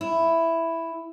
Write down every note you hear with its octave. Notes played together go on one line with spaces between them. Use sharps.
E4